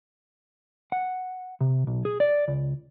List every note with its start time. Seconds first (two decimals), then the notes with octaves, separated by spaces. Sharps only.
0.92 F#5
1.61 C3
1.87 B1
2.05 G#4
2.20 D5
2.48 C#2